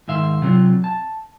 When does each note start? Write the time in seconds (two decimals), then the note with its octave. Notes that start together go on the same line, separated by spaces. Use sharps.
0.08 G#2 D#3 E5 F5 C6
0.42 C3 F#3 C4 F4
0.84 A5